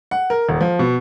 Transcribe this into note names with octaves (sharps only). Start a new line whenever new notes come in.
F#5
A#4
D#1
F3
B2